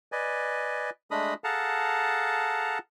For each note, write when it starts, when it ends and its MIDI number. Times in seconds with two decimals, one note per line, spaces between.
0.12 0.90 71
0.12 0.90 74
0.12 0.90 75
0.12 0.90 80
1.11 1.34 56
1.11 1.34 57
1.11 1.34 62
1.11 1.34 75
1.11 1.34 83
1.11 1.34 87
1.44 2.78 68
1.44 2.78 69
1.44 2.78 77
1.44 2.78 78
1.44 2.78 81
1.44 2.78 82